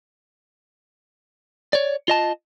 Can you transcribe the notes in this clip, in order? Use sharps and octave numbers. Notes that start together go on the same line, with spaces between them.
C#5 D5
F4 D#5 A5